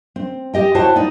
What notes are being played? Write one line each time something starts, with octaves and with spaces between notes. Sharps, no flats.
C4
G4 D#5 G5
E4 F#4 C5 C#5 G5 A5
D#4 D5